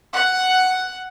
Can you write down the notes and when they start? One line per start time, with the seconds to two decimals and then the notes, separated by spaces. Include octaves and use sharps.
0.15 F#5